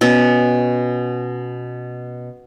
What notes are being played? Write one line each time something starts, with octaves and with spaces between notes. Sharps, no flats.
B2 B3 C#4